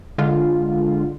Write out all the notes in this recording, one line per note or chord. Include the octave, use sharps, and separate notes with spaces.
D3 G#3 F4